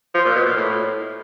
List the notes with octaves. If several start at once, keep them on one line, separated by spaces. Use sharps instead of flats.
F3
A#2
B2
A#2
A2